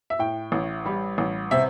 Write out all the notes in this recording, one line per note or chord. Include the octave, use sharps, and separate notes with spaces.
E5
A2 G5
A1
G3
A1
C3 E5